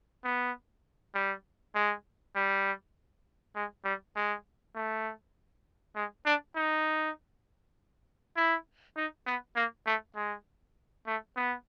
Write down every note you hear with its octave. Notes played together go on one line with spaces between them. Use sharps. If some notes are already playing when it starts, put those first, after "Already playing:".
B3
G3
G#3
G3
G#3
G3
G#3
A3
G#3
D4
D#4
E4
D#4
B3
A#3
A3
G#3
A3
B3